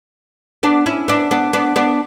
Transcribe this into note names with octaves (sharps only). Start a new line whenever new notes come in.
B3 D4
C#4 E4
B3 D4
B3 D4
B3 D4
B3 D4